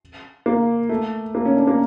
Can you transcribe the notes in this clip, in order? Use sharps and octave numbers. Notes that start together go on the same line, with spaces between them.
A#3
A3
A#3
C#4
D4
A#3